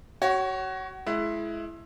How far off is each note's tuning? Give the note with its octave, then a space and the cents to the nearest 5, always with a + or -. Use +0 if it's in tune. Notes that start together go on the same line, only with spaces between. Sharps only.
F#4 +30 C#5 +0
G#3 +35 E4 +15